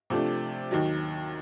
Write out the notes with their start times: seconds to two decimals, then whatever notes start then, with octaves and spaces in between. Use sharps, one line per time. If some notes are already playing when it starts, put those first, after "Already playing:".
0.10 C3 F3 A3 D4
0.71 D#2 D#3 F#3